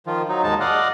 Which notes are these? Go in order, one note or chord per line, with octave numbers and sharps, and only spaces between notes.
D#3 F3 F4
F#3 D#4
D#2 G#2 G#3 D#4 A5
D5 D#5 F5 F#5